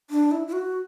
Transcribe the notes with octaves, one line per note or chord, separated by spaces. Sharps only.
D4
E4
E4
F#4